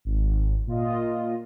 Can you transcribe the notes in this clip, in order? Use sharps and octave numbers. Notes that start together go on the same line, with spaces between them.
G#1
A#2 F4 D#5